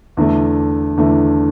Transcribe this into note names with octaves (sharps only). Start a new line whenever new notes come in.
E2 D3 A3
E2 D3 A3